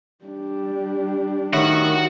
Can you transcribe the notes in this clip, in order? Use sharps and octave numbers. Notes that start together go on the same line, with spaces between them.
G3 D4
A2 D#3 F#4 F#5